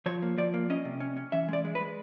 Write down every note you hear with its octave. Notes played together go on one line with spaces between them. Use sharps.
F3 C#5
A#3
F3 D5
A#3
C#4 D#5
C3
C#4
C#4
E3 E5
G#3 D5
G#3
B4
G#3